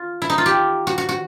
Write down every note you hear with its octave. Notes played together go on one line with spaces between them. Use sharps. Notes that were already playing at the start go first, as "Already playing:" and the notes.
Already playing: F4
E4
D#4
F4
G4
F#4
F#4
F#4